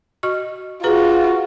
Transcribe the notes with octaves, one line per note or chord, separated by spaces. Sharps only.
F#4 D#5 C#6
F4 F#4 G#4 B4 A#5